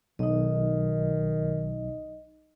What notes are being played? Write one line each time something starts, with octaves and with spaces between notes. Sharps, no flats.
B1 D#3 D#4 D#5